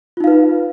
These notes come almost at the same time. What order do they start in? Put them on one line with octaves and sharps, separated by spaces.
F4 D#4 F5 B4